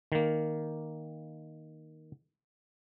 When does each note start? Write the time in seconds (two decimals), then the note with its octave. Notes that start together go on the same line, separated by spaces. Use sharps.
0.12 D#3 A#3